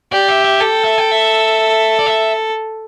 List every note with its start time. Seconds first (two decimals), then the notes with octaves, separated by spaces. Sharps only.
0.12 G4 D5
0.28 E5
0.45 E5
0.60 A4 G5
0.84 E5
0.98 G5
1.11 E5
1.99 D5
2.06 E5